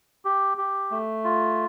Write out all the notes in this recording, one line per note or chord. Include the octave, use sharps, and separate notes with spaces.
G4
G4
A3
F4